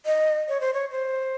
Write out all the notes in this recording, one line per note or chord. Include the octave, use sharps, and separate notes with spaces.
D#5
C#5
C5
C#5
C5